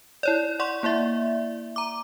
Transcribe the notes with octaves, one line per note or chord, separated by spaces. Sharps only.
E4 C#5 D5
D5 F#5 C6 C#6
A#3 E4 D5 E5
A#5 D6